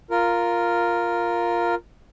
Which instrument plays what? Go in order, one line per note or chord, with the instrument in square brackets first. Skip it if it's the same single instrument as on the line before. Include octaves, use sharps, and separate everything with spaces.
[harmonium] F4 A#4